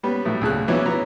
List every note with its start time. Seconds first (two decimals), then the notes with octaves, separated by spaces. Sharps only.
0.03 G3 B3 C#4
0.25 A2 F#3 A3
0.41 D2 C#3 A5 F#6
0.68 E3 F#3 B3 C#4 D4 E4
0.86 F#3 B3 A#5